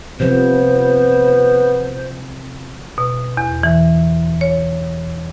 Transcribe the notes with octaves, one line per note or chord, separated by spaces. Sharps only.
C3 F3 B3 C5
B2
E2
E3
C#5